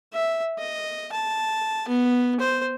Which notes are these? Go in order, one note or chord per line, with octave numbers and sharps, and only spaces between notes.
E5
D#5
A5
B3
C5